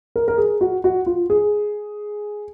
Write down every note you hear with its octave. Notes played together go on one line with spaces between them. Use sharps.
A#4
A#4
G#4
F#4
F#4
F4
G#4